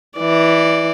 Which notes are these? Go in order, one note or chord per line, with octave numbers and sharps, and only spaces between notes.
E3 D5